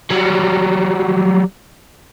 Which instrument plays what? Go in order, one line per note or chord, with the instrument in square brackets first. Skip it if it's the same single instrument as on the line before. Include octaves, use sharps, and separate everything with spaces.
[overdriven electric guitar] F#3 G3